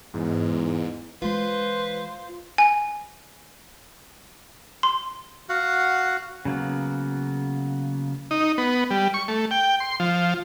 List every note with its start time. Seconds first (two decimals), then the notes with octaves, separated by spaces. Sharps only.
0.14 E2 G#2
1.22 E3 G#3 F4 B4 C5
2.58 G#5
4.83 C6
5.49 F#4 F5 F#5
6.45 C#3 F#3 A#3 B3
8.31 D#4
8.58 B3
8.91 G3
9.14 C#6
9.28 A3
9.51 G5
9.80 C6
10.00 F3